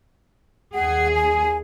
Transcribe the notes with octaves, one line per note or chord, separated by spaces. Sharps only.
D#2 G#4 F#5
G#5